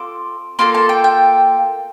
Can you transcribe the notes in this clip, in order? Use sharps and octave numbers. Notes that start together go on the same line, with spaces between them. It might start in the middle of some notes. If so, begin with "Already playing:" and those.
Already playing: C4 F4 A4 D6
A#3 F4 A4 C6
A5
G5
G5